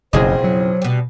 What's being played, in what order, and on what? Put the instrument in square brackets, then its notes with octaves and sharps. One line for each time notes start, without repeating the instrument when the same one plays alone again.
[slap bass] F#1 [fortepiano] B1 G#4 D#5 [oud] F2 C#3 E4 [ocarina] C5
[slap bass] F#3
[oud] B2 G3